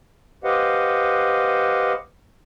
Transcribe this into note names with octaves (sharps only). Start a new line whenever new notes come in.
G4 B4 C5 D#5 F5 F#5